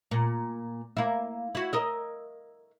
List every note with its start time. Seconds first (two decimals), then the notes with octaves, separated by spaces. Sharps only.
0.11 A#2
0.97 A#3 E4
1.55 E4 F#4
1.73 A#4 D#5 E5